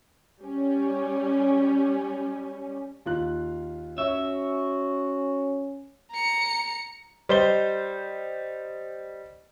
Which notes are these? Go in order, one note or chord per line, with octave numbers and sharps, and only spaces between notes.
G3 C#4
D#2 F4 F#6
C#4 F#4 C#5 E5
A#5 C#7
G3 C5 D#5 G7